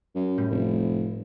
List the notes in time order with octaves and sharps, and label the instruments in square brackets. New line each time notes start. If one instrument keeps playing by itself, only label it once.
[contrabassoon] F#2
[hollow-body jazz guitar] A2 G3
[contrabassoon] F1